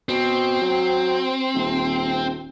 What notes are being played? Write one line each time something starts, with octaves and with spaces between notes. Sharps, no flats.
B2 C4
F#3
D#1